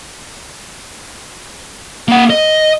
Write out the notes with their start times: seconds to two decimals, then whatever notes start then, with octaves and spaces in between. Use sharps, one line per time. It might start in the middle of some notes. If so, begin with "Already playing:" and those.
2.08 A#3 F#5
2.30 D#5